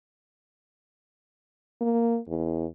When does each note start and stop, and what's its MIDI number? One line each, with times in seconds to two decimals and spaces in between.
1.81 2.18 58
2.27 2.66 40